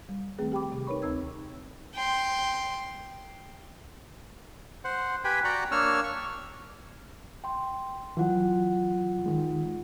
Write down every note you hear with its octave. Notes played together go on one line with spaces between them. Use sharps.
G3
D#3 A3 C4 G#4 B4
G4 G5 B5 D6
C3
D#4 A#4 B4 C#5 B5 C#6
D2 C4 E6 G#6
G5 C6
C5 F#5
G4 B4 G5 G#5 B5
F#4 D5 F#5 G5 A#5
A#3 D4 C#5 E6 F6
C#6
G5 C6
E3 F#3 F4 F#5
D#3 G#3